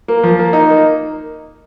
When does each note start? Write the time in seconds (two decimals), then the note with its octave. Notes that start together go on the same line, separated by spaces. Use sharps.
0.08 A#3
0.23 F3
0.39 A#3
0.53 D#4
0.69 A#3